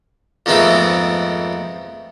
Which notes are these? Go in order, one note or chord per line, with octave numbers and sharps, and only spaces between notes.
F2 G#2 D#3 A3 B3 C4